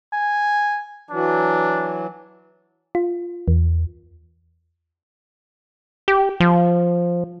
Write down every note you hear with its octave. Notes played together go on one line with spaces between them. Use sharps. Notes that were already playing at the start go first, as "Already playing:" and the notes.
G#5
E3 F#3 D4
F4
E2
G4
F3